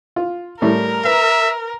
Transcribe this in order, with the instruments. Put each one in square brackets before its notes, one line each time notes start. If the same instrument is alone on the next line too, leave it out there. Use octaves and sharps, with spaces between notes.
[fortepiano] F4
[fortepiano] A2 G3 A3 [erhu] A#4
[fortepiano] B4 [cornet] E5